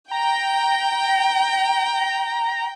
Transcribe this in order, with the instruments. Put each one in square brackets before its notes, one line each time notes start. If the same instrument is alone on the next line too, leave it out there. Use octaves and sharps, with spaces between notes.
[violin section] G5 [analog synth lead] A#5